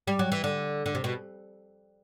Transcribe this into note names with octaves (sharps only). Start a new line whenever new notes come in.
G3
F#3
E3
D3
D3
C3
B2